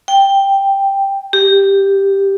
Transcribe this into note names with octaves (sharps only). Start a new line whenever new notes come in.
G5
G4